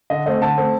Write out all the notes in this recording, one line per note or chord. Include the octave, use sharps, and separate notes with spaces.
D3 D#5
A3 C4 D#5
D3 A5
A3 C4